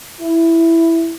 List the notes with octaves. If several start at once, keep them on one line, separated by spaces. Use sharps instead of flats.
E4